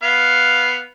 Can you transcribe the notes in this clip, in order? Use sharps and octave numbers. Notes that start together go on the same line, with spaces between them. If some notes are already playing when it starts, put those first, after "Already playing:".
B3 F5 F6